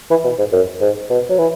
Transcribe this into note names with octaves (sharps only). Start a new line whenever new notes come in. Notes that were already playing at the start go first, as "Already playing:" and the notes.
E3
B2
G#2
F#2
G#2
B2
F#3
E3